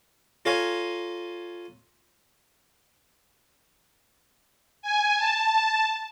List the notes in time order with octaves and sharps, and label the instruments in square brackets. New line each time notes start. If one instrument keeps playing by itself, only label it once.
[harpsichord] F4 A4 C#5 F5 G#5 A#5
[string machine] G#5
A5